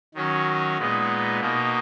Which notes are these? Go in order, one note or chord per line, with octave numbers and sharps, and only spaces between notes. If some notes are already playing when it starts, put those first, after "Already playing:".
D#3 F#3 C#4
A#2 G#3 B3 D#4
B2 A#3 D#4